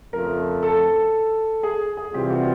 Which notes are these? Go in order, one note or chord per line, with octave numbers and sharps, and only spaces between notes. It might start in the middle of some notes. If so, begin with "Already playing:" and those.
F2 C#3 F3 A3 A#4
A4
G#4
G#4
C3 E3 G3 C4 F4 G4
F#4